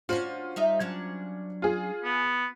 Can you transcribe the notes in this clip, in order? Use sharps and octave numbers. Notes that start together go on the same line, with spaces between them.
C#4 D4 F4 F#4 C5
G3 D#4 E5
F#3 C#4 D4
F4 G#4
B3